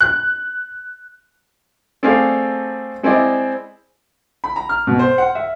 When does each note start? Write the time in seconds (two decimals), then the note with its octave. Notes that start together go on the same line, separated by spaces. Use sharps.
0.01 F#6
2.03 A3 C4 G#4 A4 D5 F5
3.03 G#3 C4 E4 D5 D#5
4.44 B5
4.56 A#5
4.69 F6
4.87 B2
4.99 C5
5.18 F#5
5.35 E5